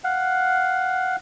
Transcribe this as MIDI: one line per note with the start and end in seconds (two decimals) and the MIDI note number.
0.04 1.16 77
0.04 1.16 78